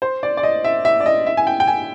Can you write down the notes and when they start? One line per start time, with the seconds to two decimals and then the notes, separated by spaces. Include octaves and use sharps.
0.02 C5
0.23 D5
0.37 D5
0.43 D#5
0.64 E5
0.85 E5
1.00 D5
1.06 D#5
1.26 E5
1.37 G#5
1.47 G5
1.60 G5
1.68 G#5